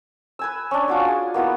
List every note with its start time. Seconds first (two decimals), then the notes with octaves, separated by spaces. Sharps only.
0.39 B4 G#5 E6
0.71 C#4 D4
0.88 F4 F#4 D5
1.08 G#4
1.34 A#3 B3 E4 F#4